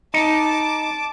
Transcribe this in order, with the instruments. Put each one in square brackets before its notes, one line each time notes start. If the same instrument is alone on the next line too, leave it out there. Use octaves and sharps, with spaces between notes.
[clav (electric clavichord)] D#4 [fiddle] A5 D6